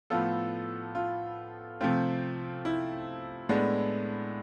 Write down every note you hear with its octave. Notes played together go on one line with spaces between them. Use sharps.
A2 F3 B3 F4 A4
F4
C3 F3 A3 C4 F4
E4
A2 G#3 B3 D4